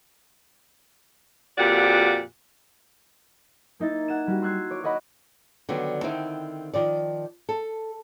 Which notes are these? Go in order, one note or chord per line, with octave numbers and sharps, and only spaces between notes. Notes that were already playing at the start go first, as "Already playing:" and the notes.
F2 A#2 F#4 G4 D5 F#5
A#3 D#4 E4 A6
F#5 G#6 E7
G3 F#4
C6 E6 F#6 G#6 C7
C#5 D6
F#4 C#5 D#5 F#5 B5 D6
D3 D#3 F#3 G3 B3
D3 D#3 C4 D#4 E4
D#3 F3 D5
A4